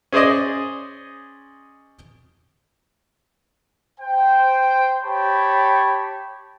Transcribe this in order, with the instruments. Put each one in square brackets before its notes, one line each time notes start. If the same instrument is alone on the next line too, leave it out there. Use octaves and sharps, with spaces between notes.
[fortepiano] C#4 G#4 C5 D5 D#5
[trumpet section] C5 G5
G4 C#5 G5 A5 B5